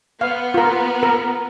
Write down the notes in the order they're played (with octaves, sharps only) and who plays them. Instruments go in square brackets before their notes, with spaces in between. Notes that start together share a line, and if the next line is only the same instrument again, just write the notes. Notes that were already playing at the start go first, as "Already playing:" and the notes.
[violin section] B3 [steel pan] F5
[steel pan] F4 A#4
A#4